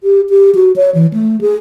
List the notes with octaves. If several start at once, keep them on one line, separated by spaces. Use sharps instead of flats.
G4
G4
F#4
C#5
E3
A3
G#4